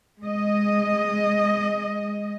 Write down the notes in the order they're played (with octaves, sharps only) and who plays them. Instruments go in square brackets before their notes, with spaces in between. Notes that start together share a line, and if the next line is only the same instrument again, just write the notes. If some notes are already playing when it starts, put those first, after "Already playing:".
[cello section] G#3 D#5